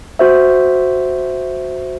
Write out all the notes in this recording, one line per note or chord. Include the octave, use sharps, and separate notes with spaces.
F#4 C5 E5